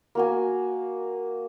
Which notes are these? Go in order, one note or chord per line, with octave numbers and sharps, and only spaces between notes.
A#3 F#4 G#5